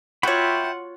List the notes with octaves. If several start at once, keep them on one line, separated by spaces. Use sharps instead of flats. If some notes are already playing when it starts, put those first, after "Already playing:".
F4 F#4 C#5 E5 F#5 G5 B5